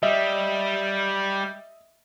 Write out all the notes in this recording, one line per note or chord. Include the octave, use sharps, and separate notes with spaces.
G3 D#5 E5